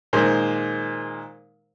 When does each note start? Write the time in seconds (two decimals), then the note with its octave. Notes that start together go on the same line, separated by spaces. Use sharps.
0.13 A#2 D#3 G#3 A#4 C5